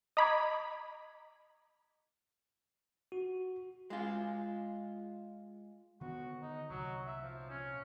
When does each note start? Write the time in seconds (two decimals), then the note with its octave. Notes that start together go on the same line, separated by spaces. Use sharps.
0.17 D#5 A#5 B5 D6 G#6
3.12 F#4
3.90 G#3 F4
6.01 D3 D#3 B3 F#4
6.42 D#4
6.69 C2 A#2 F#3
7.06 E5
7.23 F3
7.50 C#4